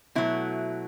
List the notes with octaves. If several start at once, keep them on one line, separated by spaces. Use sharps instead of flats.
B2 F#3 A3 E4